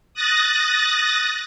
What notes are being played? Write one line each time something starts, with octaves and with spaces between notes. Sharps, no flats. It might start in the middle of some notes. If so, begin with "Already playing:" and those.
D#6 F#6 A6 A#6